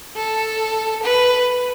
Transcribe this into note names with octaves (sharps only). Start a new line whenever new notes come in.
A4
B4